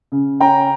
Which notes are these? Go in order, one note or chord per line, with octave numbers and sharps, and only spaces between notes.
C#3
C#4 G5 A#5